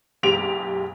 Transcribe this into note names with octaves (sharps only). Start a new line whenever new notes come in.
F#1 B1 G#3 G4 D7 F7